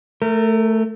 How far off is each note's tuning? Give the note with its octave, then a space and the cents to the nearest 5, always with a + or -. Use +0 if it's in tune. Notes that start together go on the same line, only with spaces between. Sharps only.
A3 +0 A#4 -25